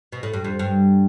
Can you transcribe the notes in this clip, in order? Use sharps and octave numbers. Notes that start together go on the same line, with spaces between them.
B2
A2
G2
F2
G2